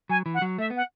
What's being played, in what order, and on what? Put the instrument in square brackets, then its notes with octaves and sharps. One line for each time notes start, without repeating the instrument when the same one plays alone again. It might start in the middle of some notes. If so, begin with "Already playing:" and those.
[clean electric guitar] F#3 [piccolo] G#5
[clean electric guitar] E3
[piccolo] F#5
[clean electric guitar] F#3
[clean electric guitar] A3 [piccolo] E5
[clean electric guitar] B3
[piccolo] F#5